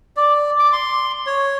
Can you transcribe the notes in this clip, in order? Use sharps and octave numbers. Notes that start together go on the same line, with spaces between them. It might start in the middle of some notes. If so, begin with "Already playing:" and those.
D5
D6
C6
C#5